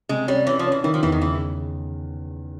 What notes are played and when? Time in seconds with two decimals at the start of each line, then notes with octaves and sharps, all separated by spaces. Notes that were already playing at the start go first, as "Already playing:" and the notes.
0.09 C3 G#3
0.28 G3 C#4
0.46 E3 C#4
0.59 F3
0.66 C#4
0.72 E3
0.84 D#3 E3
0.94 F3
1.02 E2 E3
1.12 D#3
1.22 C#3 E3